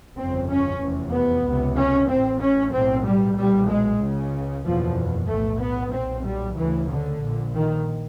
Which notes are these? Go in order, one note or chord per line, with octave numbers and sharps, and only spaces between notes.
G1 F2 C#3 C4
C#4
F1 E2 C3
B3
C#2 C3
C#4
A1 A2 C4
C#4
B1 A2 C4
G3
B1 A#2 G3
G#3
C#2 C#3
F#1 E2 B2 F3
B1 A2 A3
B3
B1 A#2 C4
G3
D2 C#3 E3
D3
A#1 A#2
D#3